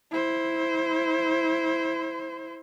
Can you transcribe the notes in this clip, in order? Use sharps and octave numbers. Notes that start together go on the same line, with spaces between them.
E4 C5